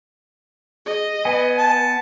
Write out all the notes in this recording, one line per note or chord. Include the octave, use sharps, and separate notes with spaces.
G#4 D#5
B3 B4 G#5
A5